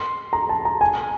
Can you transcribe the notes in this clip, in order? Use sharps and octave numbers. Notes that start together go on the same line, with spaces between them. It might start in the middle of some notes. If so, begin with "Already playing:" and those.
Already playing: C6
A#5
A5
A#5
G#5